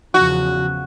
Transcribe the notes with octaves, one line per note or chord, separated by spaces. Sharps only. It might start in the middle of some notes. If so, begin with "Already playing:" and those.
E2 C#3 F3 F#4